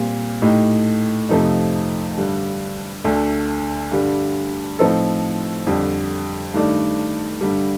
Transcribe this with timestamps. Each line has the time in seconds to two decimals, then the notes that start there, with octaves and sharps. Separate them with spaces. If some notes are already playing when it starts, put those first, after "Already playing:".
Already playing: A#2 G3 C4
0.42 A2 A3 D#4 G4
1.29 F2 C3 F3 A3 D#4
2.18 G2 D3 G3
3.04 D2 D3 A3
3.92 G2 D3 G3
4.79 A2 F3 C4 D#4 A4
5.67 F2 D3 G3
6.54 G2 D#3 A3 D4
7.41 G2 D3 G3